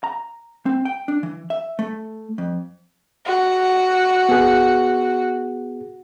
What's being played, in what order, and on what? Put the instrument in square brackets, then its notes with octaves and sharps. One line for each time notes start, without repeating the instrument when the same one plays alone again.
[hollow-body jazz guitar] A#5
C4
G5
D4
E3
E5
A3
F2
[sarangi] F#4
[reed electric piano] B3 G#4